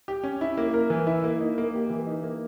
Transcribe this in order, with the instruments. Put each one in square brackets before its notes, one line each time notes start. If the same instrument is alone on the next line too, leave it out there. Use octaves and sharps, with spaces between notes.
[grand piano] G4
C#4
E4
A#3
A#4
E3
E4
A#3
D#4
A#3
G4
E3
D#4
A#3